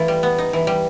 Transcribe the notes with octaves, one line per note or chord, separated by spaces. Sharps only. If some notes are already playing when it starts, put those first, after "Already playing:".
Already playing: E3 A3 F4
G3
B3
D#4
E3
G3